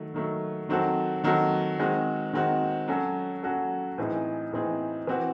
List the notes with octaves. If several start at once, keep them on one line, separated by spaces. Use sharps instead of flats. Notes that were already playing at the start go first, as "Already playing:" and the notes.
Already playing: D#3 F#3 A3
D#3 F#3 A3
D#3 F#3 C4 F#4 A4
D#3 F#3 C4 F#4 A4
D#3 G#3 C4 F#4
D#3 G#3 C4 F#4
F#3 C#4 F#4 A4
F#3 C#4 F#4 A4
A2 E3 C4 D#4 G#4
A2 E3 C4 D#4 G#4
E3 C4 F#4